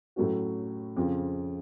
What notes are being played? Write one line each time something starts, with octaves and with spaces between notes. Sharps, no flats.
A2 F#3 A3 C#4 F#4
F2 C#3 F3